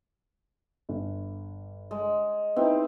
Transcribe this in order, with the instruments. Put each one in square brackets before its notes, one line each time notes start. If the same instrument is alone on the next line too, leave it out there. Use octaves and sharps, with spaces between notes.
[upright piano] G1
[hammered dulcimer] G#3
[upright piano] B3 D#4 E4 [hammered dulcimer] C4